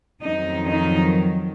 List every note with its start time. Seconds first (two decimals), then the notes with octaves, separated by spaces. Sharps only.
0.22 F2 D#3 F#3 D#4
0.67 D#4